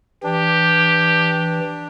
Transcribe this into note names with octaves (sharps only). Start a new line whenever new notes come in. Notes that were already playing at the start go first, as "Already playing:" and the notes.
E3 D4 G4